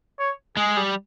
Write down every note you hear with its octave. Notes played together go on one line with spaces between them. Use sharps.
C#5
G#3 G#4
G3